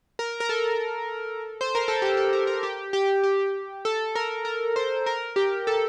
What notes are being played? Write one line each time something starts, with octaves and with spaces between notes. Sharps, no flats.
A#4
A#4
A4
C5
A#4
A4
G4
A4
A#4
A#4
G4
G4
G4
A4
A#4
A#4
C5
A#4
G4
A4